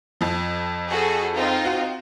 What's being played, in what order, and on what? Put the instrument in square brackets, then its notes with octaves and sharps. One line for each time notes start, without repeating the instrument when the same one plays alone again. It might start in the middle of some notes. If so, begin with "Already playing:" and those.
[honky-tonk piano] F2 F3
[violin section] F#4 G#4 A4
C4 D#4 F4
[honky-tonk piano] F#4